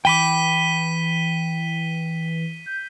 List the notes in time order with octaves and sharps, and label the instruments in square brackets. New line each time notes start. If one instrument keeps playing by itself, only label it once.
[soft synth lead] E3 [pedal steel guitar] G5 B5 D6 [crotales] B6 D#7 G7
[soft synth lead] G6